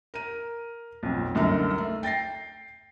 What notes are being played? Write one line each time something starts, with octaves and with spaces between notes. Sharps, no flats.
A#4 D#7
B1 F2
C2 F#2 D3 D#4 A#4
A3
G5 A6 A#6 C7